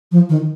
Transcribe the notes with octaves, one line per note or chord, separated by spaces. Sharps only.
F3
D#3